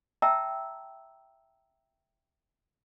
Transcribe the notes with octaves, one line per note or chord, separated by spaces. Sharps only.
E5 G5 A5 A#5 E6